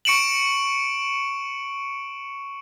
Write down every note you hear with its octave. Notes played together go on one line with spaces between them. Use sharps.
C#6 C#7 D7 E7 F#7